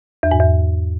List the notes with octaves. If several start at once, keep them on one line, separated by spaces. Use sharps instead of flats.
E2
G#2
E2